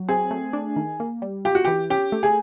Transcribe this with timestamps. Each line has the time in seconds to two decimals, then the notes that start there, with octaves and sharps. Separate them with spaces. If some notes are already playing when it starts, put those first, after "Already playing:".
Already playing: F#3
0.09 C4 G#4
0.31 A3
0.53 D4
0.76 D#3
1.00 A#3
1.22 G3
1.45 F4 G4
1.55 F#4
1.65 E3 G4
1.90 C#4 G4
2.12 A3
2.23 G#4